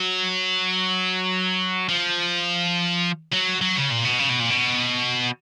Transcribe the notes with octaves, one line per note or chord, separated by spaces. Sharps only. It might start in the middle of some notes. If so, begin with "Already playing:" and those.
Already playing: F#3
F3
F#3
F#3
C#3
A#2
B2
C#3
B2
A#2
B2